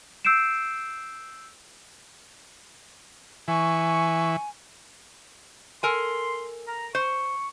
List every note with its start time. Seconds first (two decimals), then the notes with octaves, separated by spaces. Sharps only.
0.25 E6 G6 C7 D7 E7
3.48 E3 G#5 C#6
5.83 A4 A#4 G#5 C6
6.68 A#5
6.95 C5 C#6